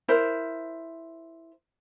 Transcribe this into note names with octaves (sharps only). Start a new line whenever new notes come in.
E4 A#4 C5